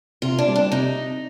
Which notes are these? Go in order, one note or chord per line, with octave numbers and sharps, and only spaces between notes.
C3 F4
D4
G3 C4
D4
C3 D#4